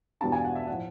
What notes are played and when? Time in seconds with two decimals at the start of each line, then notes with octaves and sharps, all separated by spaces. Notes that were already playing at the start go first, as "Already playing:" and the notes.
0.21 E2 B2 G3 B3 D4 A5
0.32 G#5
0.45 F#5
0.55 E5
0.67 A2 F3 F#5